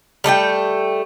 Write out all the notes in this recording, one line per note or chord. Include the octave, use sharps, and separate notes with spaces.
G3 A3 D#5 G5